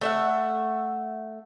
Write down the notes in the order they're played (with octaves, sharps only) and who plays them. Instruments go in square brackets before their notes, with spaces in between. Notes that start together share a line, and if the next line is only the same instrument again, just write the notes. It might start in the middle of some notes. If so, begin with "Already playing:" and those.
[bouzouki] A3 E5 F#5